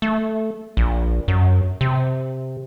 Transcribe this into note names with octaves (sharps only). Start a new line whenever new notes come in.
A3
A#1
F#2
C3